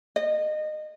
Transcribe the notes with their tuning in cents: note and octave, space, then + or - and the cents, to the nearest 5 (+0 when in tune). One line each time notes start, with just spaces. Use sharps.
D#5 -25